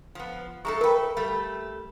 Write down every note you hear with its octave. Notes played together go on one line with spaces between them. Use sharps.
F3 B3
G#3 A3 A4 A#5 C#6
A3 A#4 B4 G5
G3 A3